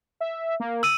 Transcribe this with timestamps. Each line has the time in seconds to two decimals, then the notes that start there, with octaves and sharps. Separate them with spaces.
0.21 E5
0.60 A#3
0.83 E6 D#7